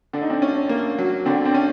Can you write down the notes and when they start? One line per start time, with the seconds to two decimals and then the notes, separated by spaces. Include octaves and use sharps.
0.13 D3 D4
0.22 D#4
0.30 C4 D4
0.42 C#4
0.69 A#3
0.98 F#3
1.25 D3 C4 D4
1.45 C4 D4
1.54 C#4